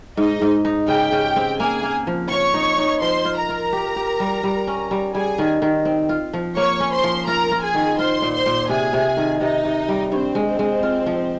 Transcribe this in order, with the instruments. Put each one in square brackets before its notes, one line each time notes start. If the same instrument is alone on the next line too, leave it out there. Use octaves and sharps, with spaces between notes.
[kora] G#2 [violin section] D#4 D#5
[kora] G#2
D#4
[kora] C#3 [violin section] G4 G5
[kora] C#3
C4
[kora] A#3 [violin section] G#4 G#5
[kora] A#3
F3
[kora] F3 [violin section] C#5 C#6
[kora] D#4
D#4
[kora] F3 [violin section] C5 C6
[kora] F4
[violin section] A#4 A#5
[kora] F4
G4
G4
G3
G3
C#4
G3
[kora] G3 [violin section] G#4 G#5
[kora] D#3
D#3
C4
F4
F3
[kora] A#3 [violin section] C#5 C#6
[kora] C#4
[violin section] C5 C6
[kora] F3
[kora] F4 [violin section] A#4 A#5
[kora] F4
[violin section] G#4 G#5
[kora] D#3
[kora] F4 [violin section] C5 C6
[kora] A#2
[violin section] C5 C6
[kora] A#2
[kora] C3 [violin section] G#4 G#5
[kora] C3
D#3
[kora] C3 [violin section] D#4 D#5
[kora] C3
G3
[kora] G2 [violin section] C4 C5
[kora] G#3
[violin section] C4 C5
[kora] G#3
F4
F3